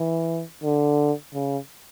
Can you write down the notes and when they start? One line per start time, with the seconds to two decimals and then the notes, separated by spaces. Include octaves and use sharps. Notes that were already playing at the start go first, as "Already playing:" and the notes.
Already playing: E3
0.63 D3
1.33 C#3